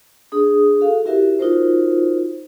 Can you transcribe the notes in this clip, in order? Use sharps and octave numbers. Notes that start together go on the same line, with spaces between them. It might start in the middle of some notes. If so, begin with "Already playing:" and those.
D4 G#4 D#6
F#4 A4 F5
E4 F#4 G4 A#4 E5
D#4 F4 F#4 A#4 C5